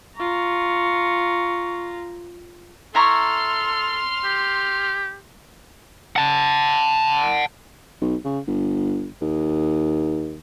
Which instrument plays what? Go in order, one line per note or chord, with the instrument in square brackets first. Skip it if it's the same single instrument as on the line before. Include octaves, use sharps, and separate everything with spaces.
[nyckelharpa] F4 A#5 [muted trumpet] C#6
[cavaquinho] E4 A#5 C#6 [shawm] A4 [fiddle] C6 F6
[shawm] G4
[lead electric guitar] F#5 A5
[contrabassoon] B1
C#3
G1
D#2